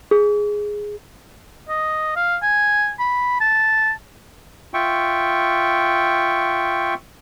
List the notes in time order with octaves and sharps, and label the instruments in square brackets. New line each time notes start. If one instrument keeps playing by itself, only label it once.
[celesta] G#4
[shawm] D#5
F5
G#5
B5
A5
[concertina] F4 E5 G5 C#6